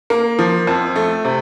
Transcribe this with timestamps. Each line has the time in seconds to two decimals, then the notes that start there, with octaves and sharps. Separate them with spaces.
0.10 A#3
0.39 F3
0.67 F2
0.96 A3
1.25 C3